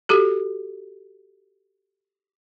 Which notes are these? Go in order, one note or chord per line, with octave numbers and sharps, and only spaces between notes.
F#4 G4 A4